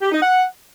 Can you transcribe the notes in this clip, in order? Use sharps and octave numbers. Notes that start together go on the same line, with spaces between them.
G4
D#4
F#5